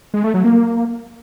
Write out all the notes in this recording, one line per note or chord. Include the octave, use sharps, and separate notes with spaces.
G#3
A3
F#3
A#3